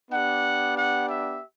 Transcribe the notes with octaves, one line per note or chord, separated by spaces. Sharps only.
B3 D4 G4 F#5
F#5
E5